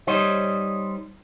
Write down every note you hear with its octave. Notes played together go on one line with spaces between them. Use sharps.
G3 D#4 C5 C#5 D#5